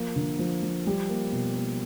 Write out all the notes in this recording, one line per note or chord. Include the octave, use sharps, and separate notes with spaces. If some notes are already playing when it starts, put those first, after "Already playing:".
Already playing: F3 A#3
D3
F3
F3
G3
A#3
B2
A#3